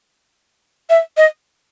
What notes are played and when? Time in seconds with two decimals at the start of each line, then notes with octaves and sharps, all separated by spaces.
0.90 E5
1.17 D#5